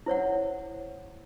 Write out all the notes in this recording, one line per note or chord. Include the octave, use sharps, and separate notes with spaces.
E4 C5 C#5 F#5